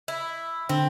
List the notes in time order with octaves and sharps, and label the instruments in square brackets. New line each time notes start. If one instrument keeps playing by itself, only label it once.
[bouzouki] E4
[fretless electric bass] D3 [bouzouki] C4